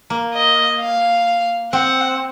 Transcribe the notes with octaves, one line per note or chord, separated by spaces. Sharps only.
A#3
D#5
F5
C4 F#5